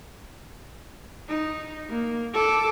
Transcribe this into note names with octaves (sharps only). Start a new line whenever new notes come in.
D#4
A#3
A4 D6